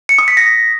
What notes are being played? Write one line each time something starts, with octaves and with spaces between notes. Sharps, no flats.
C#7
D#6
B6
A#6